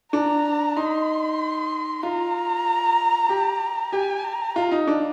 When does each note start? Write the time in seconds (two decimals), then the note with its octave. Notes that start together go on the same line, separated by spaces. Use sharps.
0.13 D4 A#5
0.76 D#4 C6
2.03 F4 A#5
3.29 G4
3.92 G4 G#5
4.24 A#5
4.56 F4
4.71 D#4
4.87 D4